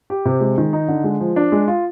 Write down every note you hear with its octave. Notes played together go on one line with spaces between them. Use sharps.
G4
C3
G#3
D#3
D#4
D3
G#3
F3
D4
G#3
F4